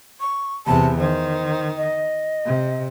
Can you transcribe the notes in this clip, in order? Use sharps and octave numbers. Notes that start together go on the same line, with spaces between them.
C#6
E2 C3 A5
D#3 C5
D#5
C3